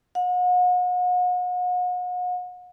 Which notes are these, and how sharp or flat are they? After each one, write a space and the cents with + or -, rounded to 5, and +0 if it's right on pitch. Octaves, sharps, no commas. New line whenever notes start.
F#5 -40